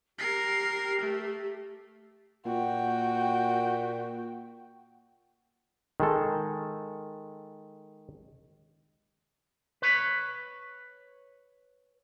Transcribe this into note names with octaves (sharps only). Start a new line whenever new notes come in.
G4 A#4 C7
A3
A#2 F#4 G5
D#3 G#3 A4
B4 C#5